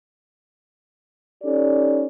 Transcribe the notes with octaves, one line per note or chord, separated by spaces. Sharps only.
C#4 D#4 G4 A4 D5